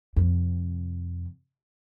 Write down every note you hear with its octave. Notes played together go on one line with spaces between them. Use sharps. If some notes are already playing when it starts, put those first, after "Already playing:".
F2 C3